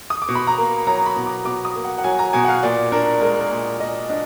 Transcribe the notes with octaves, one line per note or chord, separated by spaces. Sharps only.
D#6
D6
B2
B5
A#5
A#3
F#3 A#5
B5
B2
D6
B2 D6
D#6
A#3
F#5
F#5
F#3 G#5
A#5
B2 G#5
F#5
F5
A#2 D5
D4 A#4
G#3 A#4
A#4
A#2
A#2 D#5
D4 D#5